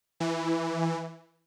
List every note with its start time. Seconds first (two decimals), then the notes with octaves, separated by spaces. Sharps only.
0.20 E3